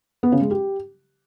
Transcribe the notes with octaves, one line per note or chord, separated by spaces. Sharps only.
B3
C#3
G#3
G4